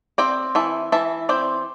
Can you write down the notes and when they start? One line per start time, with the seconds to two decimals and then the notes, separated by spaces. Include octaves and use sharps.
0.18 C4 D5 G5
0.55 E3 E5 A5
0.92 E3 E5 A5
1.29 C4 D5 G5